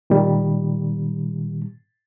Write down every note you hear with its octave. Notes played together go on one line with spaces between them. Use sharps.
A#2 D#3 G3